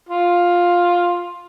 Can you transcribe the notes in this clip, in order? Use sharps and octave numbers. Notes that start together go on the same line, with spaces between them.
F4